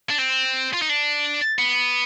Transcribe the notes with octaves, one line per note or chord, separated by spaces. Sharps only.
D4
C4
F4
D#4
D4
B3